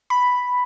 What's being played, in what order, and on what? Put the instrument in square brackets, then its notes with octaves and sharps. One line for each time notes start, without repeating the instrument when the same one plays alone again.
[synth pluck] B5